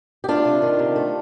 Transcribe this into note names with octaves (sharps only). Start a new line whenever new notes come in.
G4
A3 D4 F4
C3
D#3
C3
A3